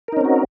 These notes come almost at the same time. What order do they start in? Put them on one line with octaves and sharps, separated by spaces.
A#4 D#4 C#4 C4 F#4